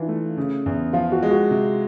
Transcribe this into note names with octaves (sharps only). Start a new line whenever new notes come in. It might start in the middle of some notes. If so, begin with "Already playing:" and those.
Already playing: E3 D4 D#4 F4
A3
C#3
E2
F3 F4
F#4
G#3
F#4
C3